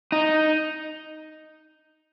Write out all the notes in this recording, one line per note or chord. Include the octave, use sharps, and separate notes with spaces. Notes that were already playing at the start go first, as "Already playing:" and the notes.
D#4